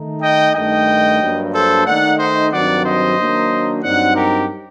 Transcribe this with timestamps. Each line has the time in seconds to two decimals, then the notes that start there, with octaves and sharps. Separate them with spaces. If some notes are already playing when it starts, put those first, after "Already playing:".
Already playing: D#3 A3 D#4
0.23 D#5 G5
0.55 G2 D#3 A3 D#4 D#5 G5
1.21 G2 F#3 A#3 D4
1.53 A4 C5
1.86 D#3 A3 D#4 D5 F#5
2.19 C5 D#5
2.52 G2 D#3 F#3 C4 D5 F#5
2.85 C5 D#5
3.18 D#3 F#3 A#3 D4
3.83 G2 F#3 C4 D#4 D5 F#5
4.16 G4 A#4